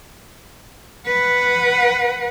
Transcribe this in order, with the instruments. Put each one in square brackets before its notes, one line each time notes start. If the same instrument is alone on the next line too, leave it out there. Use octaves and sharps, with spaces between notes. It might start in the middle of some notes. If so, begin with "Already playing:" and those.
[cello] B4 F#5